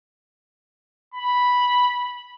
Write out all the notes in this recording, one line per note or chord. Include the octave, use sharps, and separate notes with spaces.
B5